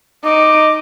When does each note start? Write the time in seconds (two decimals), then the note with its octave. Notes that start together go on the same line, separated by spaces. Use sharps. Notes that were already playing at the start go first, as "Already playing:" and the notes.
0.24 D#4 D6